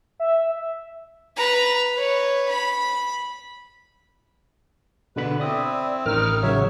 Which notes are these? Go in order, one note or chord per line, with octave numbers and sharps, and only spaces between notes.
E5
B4 A#5
B4 C#5
B5
B2 D3 B4 B5
C4 E4 D5 D#6
A1 D#3 D#4 A#4 F6
C#3 F#3 C#5 E5